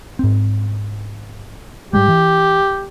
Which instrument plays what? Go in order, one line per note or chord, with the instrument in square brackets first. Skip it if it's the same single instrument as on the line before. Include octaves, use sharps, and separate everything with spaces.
[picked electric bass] G#2 C4
[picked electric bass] G#2 G3 G#3 [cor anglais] G4
[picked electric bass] E3